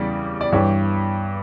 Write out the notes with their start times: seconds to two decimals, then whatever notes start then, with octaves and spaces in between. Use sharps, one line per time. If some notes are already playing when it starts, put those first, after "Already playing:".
Already playing: E2 C#3 E3 G3 D5
0.41 D5
0.52 G2 E3 G3 C#5